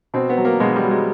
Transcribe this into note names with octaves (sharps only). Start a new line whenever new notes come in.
B2 C4
B3
F#3
A#3
B2 G#3
G3
F#3
G#3